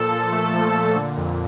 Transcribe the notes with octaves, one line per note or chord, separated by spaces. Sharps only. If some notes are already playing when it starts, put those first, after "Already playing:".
Already playing: A#2 F3 A4
A#2
A3
F3
A#2
D3
F2